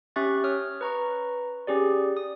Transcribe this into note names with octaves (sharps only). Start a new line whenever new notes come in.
C#4 G4 E5 C#6 F#6 A6
C#5 D#6 F6
B4 A#5 C#6
C#4 G4 G#4 D5
D#6